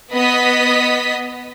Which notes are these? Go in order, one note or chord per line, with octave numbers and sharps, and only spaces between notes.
B3 D#5 D#6 B6